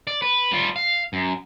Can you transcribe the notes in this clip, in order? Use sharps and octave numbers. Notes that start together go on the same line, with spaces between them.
D5
B4
G3 F4
F5
F#2